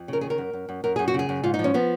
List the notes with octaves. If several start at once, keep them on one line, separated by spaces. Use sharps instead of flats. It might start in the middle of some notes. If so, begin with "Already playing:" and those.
Already playing: F2
C#3 A#4
D#3 G#4
A#4
F#2
F#2
F#2
F#2 A#4
F#2 G#4
F#4
C#3 G#4
F#2
G#2 F4
D#4
F3
C#4
F3 B3